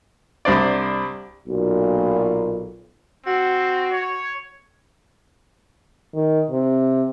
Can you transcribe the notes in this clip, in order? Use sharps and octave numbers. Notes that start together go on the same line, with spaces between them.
C2 D4 C5 D5
B1 A#2
C4 F#4
C#5
D#3
C3